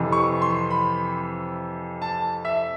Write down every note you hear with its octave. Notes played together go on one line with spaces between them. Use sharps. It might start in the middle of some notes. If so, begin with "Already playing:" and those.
Already playing: F2 C3 E3
C#6
C6
B5
A5
E5